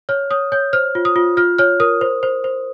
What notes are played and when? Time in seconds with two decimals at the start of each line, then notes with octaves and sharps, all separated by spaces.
0.09 C#5 F6
0.31 C#5 D#6
0.52 C#5 G6
0.73 C5 F6
0.95 F4
1.05 D#6
1.16 F4
1.37 F4 F6
1.58 C#5 F6
1.80 A#4 D#6
2.01 C5
2.23 C5
2.44 C5